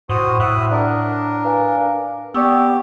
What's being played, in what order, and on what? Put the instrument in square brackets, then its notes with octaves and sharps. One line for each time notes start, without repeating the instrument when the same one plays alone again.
[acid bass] A2 [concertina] F#4 C5 D#6
[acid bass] A2 [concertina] E5 D#6 F#6
[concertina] D4 A#4 [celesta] D5 F#5 D#6
[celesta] B4 F5 G#5
[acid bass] B3 [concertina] G4 [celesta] D5 C#6 E6